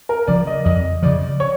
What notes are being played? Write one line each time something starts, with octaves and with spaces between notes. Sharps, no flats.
A#4
C#3 F3 D5
D#5
F2 D#5
C#3 F3 D5
C#5